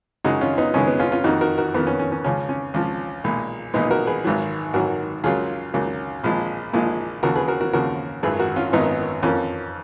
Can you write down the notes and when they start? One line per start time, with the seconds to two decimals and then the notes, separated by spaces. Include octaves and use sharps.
0.25 F#2 C#3 G#3 D#4 F#4
0.41 C#4 F4
0.58 B3 D#4
0.74 F#2 C#3 G#3 C#4
0.87 B3
0.99 C#4 F4
1.12 C#4 F4
1.24 F2 D#3 A#3 D#4 F#4
1.41 F#4 A#4
1.58 F#4 A#4
1.74 F2 D#3 A#3 B3
1.87 C#4
1.99 C#4
2.12 C#4
2.24 C#2 C#3 F3 C#4
2.49 C#4
2.74 C#2 C#3 F3
3.24 B1 A#2 G#3
3.74 B1 A#2 G#3 B3 D#4
3.91 F#4 A#4
4.07 G#4 B4
4.24 G#1 G#2 D#3 F#3
4.73 G#1 G#2 D#3 F#3 F#4 A#4
5.24 C#2 C#3 F#3 A#3 F4 G#4
5.74 C#2 C#3 F#3 A#3
6.24 A#1 A#2 F3 G#3
6.73 A#1 A#2 F3 G#3
7.23 D#2 C#3 F3 F#4 A#4
7.36 G#4 B4
7.48 F#4 A#4
7.61 F#4 A#4
7.73 D#2 C#3 F3 F#4 A#4
8.23 G#1 F#2 D#3 G#4 B4
8.39 F#4 A#4
8.56 C#4 F4
8.73 G#1 F#2 D#3 B3 D#4
9.23 F2 F3 A#3 C#4